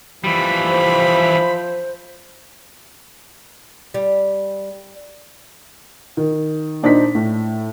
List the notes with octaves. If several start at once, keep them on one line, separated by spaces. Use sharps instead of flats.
E3 F3 G3 B5
C5
G3
D#3
A#2 D4 D#4 C5 B6
A2